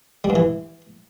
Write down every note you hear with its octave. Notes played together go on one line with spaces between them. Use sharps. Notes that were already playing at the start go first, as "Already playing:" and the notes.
G3
G2
E3